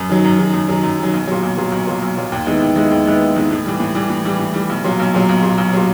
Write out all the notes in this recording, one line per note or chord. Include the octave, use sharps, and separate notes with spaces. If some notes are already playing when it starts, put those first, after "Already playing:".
Already playing: F#2
D#3 F#3
F#2
D#3 F#3
F#2
D#3 F#3
F#2
D#3 F#3
B1
A#2 F#3
B1
A#2 F#3
B1
A#2 F#3
B1
A#2 F#3
D#2
D#3 G#3 B3 E4
D#2
D#3 G#3 B3 E4
D#2
D#3 G#3 B3 E4
D#2
D#3 G#3 B3 E4
A2
E3 G3
A2
E3 G3
A2
E3 G3
A2
E3 G3
B1
A#2 F#3
B1
A#2 F#3
B1
A#2 F#3
B1
A#2 F#3